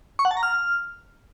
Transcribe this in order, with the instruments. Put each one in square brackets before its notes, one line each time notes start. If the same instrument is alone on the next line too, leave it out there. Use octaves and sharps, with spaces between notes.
[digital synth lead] C#6
F#5
A5
A#5
F6